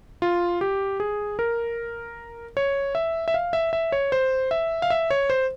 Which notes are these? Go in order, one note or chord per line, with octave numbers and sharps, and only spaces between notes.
F4
G4
G#4
A#4
C#5
E5
E5
F5
E5
E5
C#5
C5
E5
F5
E5
C#5
C5